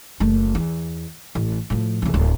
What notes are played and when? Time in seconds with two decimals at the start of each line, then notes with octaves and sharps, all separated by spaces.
0.20 F#1 A3
0.55 E2
1.35 A1
1.70 A2 F3
2.02 B1 E2
2.14 D1